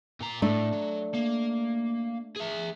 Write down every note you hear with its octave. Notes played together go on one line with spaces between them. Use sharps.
A#2 A#5
A2 A3 D4
F#3
A#3
G#4 E5